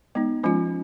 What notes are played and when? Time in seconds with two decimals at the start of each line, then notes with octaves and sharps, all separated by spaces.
0.15 G#3 B3 D#4
0.43 F3 G#3 C#4 F4